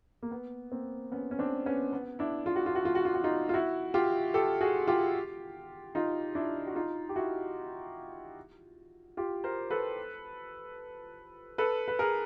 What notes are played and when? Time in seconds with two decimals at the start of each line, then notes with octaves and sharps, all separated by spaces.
0.23 A#3
0.31 B3
0.72 A#3 C4
1.12 B3 C#4
1.31 C#4
1.39 C4 D4
1.66 B3 C#4
1.93 B3
2.19 D4 E4
2.46 F4
2.56 F#4
2.66 F4
2.75 F#4
2.85 F4
2.95 F#4
3.05 F4
3.14 F#4
3.24 D#4 F4
3.49 F4
3.54 E4 F#4
3.94 F4 G4
4.34 G4 A4
4.61 F#4 G#4
4.87 F4 G4
5.95 D#4 F4
6.35 D4 E4
6.67 F#4
6.76 D#4 F4
7.09 G4
7.16 E4 F#4
9.17 F4 G4
9.44 A#4 C5
9.70 A4 B4
11.58 A4 B4
11.88 B4
11.99 G#4 A#4